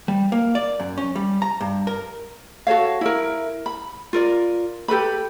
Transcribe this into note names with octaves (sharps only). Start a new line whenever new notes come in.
G3
A#3
D5
F#2
C#4
G3
A#5
G2
A#4
F#4 A4 C#5 F5
E4 A#4
B5
F4 A#4 D5
G4 A4 B4 B5